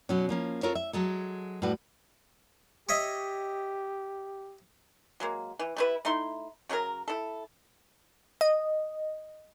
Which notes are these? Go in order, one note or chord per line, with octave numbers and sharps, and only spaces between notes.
B2 F#3 C#4
F3 A#3 C#4
C4 F4 A4 A#4 C#5
E5
F#3 G#3 A4
A2 G3 F#4 B4
G4 C#5 D#5 E5
F#3 G#3 A#3
E3
G3 E4 B4
A3 D#4 E4 C6
C#3 F#3 D#4 A#4
E4 A4
D#5